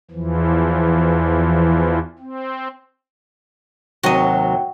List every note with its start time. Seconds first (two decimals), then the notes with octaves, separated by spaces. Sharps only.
0.11 E2 E3 F3
2.19 C4
4.03 D#2 C3 F#3 F#4 D#5 G5